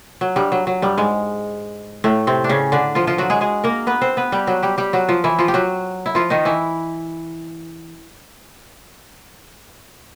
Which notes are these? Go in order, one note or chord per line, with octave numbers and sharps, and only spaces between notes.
F#3
G2 G3
F#3
F#3
G2 G3
G#2 G#3
A2 A3
C3 C4
D4
C#3 C#4
D3 D4
F3 F4
F3 F4
F#3 F#4
G#3 G#4
G#3 G#4
A#3 A#4
B3 B4
C4 C5
B3 B4
G3 G4
F#3 F#4
G3 G4
G3 G4
F#3 F#4
F3 F4
E3 E4
F3 F4
G4
F#3 F#4
E4
F3 F4
D#3 D#4
E3 E4